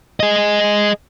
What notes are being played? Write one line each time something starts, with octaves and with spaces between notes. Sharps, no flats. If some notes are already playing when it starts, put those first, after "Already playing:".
G#4 D#5